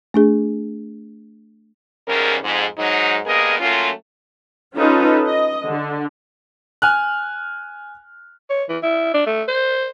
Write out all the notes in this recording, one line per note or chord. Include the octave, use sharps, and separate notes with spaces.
A3 D4 G#4
E2 G#2 C#3 G3 C#4 A#4
F2 G#2
G#2 F#3 D#4
G2 A#3 B3 G#4 A#4 D#5
F#3 A3 A#3 C#4 F4
C#4 D#4 F4 A4 B4
D#5
D3
G#5 F6 F#6
C#5
E3
E4
D4
A3
C5